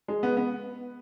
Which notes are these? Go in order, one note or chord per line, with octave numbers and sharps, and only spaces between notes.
G#3
B3
B3